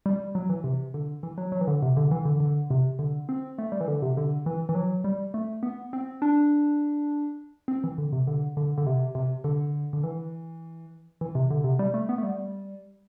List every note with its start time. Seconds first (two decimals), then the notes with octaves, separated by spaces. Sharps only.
0.06 G3
0.35 F#3
0.50 E3
0.64 C3
0.94 D3
1.23 E3
1.38 F#3
1.52 F#3
1.61 E3
1.67 D3
1.82 C3
1.97 D3
2.11 E3
2.25 D3
2.40 D3
2.70 C3
2.99 D3
3.29 C4
3.58 A3
3.72 G3
3.81 E3
3.88 D3
4.02 C3
4.17 D3
4.46 E3
4.69 E3
4.75 F#3
5.04 G3
5.34 A3
5.63 B3
5.93 C4
6.22 D4
7.68 C4
7.84 E3
7.98 D3
8.13 C3
8.27 D3
8.57 D3
8.78 D3
8.87 C3
9.15 C3
9.44 D3
9.93 D3
10.03 E3
11.21 E3
11.35 C3
11.51 D3
11.64 C3
11.79 G3
11.94 A3
12.09 B3
12.18 A3
12.23 G3